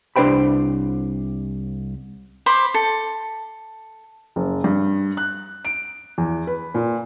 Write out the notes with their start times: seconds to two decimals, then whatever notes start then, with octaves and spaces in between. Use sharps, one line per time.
0.16 C2 D4 B4 C5 G5 B5
2.46 C5 B5 D6
2.74 A4
4.36 F#1
4.64 G2
5.17 F#6
5.65 D7
6.18 E2
6.47 B4
6.74 A#2